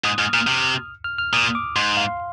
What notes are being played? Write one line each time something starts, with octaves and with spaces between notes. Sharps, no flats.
G#2 D#6
G#2 F6
A#2 F6
C3
F6
F6
A#2 D#6
D6
G#2 C6
F5